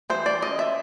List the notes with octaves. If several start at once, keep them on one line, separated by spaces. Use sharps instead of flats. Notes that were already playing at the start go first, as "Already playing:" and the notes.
E3 C5
D5
C#4 D#5
E5